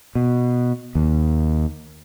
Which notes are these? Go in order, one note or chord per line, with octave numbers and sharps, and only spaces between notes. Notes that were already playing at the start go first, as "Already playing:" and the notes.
B2
D#2